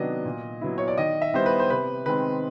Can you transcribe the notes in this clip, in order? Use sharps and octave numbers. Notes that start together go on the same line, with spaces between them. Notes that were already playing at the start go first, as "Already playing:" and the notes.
Already playing: C3 D#3 F#3 B3 D4 D#5
A#2
F#3 B3 E4
C#5
D5
D#3 D#5
E5
G3 B3 E4 C5
B4
C5
C3 B4
D#3 G#3 C4 B4